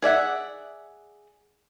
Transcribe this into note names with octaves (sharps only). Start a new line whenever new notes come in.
G#4 D5 E5 F#5